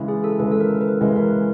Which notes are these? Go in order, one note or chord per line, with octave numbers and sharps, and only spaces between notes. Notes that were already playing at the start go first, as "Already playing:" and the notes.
Already playing: C#3 E3 G#3
G#4
A4
C#3 E3 G#3 B4
A4
A#4
B4
C#3 E3 G#3 B4
A#4